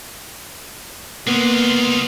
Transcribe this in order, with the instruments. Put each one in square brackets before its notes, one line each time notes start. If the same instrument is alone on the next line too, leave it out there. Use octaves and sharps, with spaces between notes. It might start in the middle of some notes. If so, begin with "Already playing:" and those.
[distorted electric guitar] G#3 F4 [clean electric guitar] A#3 B3